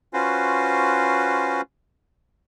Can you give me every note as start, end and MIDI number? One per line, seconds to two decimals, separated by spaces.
0.14 1.61 61
0.14 1.61 65
0.14 1.61 66
0.14 1.61 71
0.14 1.61 72